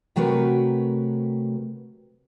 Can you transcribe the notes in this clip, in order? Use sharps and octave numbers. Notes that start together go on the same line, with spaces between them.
C3 F#3 A3 F#4 A#4 B4